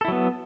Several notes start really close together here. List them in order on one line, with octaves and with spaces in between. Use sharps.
A4 E4 F#3 B3